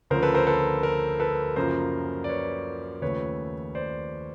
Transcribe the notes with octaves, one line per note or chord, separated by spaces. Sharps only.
D2 C#3 F3 A#4 C5
A4 B4
A#4 C5
A4 B4
A#4
A4 B4
F#2 C#3 F3 A#3 A#4 C5
D5
B4 C#5
D#2 C#3 F3 A3 B4 C#5
C5 D5